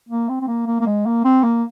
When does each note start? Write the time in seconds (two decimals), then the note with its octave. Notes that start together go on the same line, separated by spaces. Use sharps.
0.09 A#3
0.29 C4
0.41 C4
0.48 A#3
0.67 A#3
0.81 A#3
0.87 G#3
1.06 A#3
1.25 C4
1.43 A#3